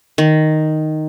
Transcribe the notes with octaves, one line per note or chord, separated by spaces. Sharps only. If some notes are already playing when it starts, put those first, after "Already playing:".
D#3